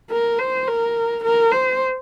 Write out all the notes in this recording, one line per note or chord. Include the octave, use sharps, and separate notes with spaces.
A#4
C5
A#4
A#4
C5